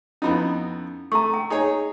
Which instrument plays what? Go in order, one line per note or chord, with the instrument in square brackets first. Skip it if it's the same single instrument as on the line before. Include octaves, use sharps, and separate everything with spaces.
[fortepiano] F2 B3 D#4 [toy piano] C#4 E4 B5
[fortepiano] A3 [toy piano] A#5 C#6
[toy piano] G5
[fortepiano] D#4 G#4 C#5